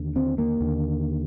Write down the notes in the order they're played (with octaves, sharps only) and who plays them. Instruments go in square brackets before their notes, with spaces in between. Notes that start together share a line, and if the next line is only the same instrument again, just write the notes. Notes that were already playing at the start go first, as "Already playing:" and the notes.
Already playing: [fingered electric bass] D#2 D3
C4
A#3
D#2 D3